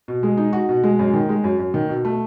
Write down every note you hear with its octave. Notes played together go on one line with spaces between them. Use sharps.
B2
G#3
D#4
F#4
B2
G#3
F#2
D#3
G#3
F#2
F#2
D#3
B2
A3